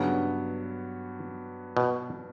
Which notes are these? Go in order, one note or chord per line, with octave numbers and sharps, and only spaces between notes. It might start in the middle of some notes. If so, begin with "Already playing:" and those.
Already playing: G2 C#3 F#3 B3
B2